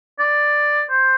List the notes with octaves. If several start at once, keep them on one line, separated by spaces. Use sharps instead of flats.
D5
C5